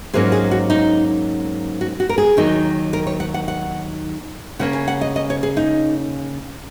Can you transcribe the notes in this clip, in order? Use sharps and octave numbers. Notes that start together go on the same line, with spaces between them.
G#2 F#3 A#3 C#4 G#4
G#4
F#4
D#4
F#4
F#4
A#4
G#4
D#2 D#3 F#3 D#4
A#4
C#5
F#5
F#5
F#5
C#3 A#3 C#4 F#5
G#5
F#5
D#5
D#5
C#5
G#4
D#4